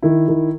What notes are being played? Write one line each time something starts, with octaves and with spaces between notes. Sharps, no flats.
D#3 E4
D#3